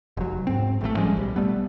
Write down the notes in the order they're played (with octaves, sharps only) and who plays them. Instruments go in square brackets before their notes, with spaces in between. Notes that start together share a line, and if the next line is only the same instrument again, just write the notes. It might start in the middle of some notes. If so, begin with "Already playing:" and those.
[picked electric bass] F1 F#3
G#2 C4
A1 A2 C3 A3
F3 G3 G#3 C#4
B1 G3
G3 A3 B3